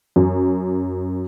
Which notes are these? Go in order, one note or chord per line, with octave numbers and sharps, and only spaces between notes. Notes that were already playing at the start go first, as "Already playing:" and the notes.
F#2